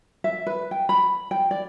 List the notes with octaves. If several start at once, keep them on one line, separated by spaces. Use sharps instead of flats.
E5
B4
G5
B5
G5
D5